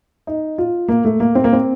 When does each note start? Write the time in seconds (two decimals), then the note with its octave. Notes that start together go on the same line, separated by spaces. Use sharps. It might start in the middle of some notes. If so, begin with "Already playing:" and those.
0.27 D#4
0.58 F4
0.88 A#3
1.05 A3
1.20 A#3
1.35 C4
1.44 A#3
1.53 C4